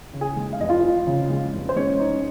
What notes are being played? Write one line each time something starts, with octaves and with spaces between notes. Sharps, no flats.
C#3
G#4 G#5
G#3
F5
F1 D#5
F4 F5
F2
C#3
G#3
F1
C5
G#3 C#4 C#5
D#4